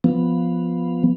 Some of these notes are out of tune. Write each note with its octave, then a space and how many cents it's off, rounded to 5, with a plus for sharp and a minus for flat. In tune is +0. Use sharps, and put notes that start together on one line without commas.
F3 +0 B3 +0